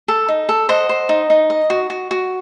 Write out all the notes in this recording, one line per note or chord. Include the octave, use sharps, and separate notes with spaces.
A4
D#4
A4
C5 D#5 F#5
C5
D#4
D#4
D#5
F#4
F#4
F#4